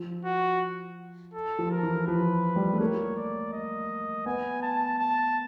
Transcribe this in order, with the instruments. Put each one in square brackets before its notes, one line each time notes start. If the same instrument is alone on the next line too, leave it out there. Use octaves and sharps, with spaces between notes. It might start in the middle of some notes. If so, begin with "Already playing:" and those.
Already playing: [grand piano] F3
[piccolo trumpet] F#4
A4
[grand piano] F3
[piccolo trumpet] A#4
[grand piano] E3
[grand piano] F3 [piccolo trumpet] B4
[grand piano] G3
A3
[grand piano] A#3 [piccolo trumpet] C#5
[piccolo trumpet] D5
D#5
[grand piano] B3 [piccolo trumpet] G#5
[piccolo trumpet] A5
A5